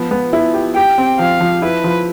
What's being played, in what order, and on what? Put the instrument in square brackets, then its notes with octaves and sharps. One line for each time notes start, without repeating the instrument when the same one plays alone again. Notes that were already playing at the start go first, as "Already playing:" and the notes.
Already playing: [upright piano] F3 B3
B3
E4
G4
[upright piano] G4 [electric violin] G5
[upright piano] C4
[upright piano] F3 [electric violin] F5
[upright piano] F3
[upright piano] E4 [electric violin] B4
[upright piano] F3